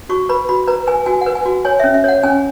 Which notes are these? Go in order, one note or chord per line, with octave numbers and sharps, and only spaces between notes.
F#4 C#6
B4 B5
F#4 B5
B4 A#5
B4 G#5
F#4 G#5
F#5
B4
G#5
F#4
C#5 G#5
C#4 E5
E5
C#5 F#5
C#4 G#5